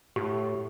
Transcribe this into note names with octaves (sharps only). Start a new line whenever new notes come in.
A2 G4